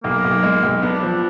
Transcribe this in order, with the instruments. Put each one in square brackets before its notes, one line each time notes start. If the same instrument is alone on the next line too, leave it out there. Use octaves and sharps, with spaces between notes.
[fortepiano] B1 [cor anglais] A#3
[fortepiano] B1
G#3
B1
[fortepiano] B3 [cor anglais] D4
[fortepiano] F3